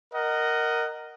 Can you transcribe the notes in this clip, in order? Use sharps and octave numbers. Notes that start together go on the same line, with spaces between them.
A#4 D#5 F#5